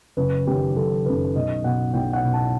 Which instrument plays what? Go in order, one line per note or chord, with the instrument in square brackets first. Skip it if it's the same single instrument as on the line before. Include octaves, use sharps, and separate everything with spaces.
[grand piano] F#1 B4
F#2 D#3 G4
F#1 A4
F#2 D#3 B4
B1 D#5
B2 F#5
B1 G5
F#5
B2
A5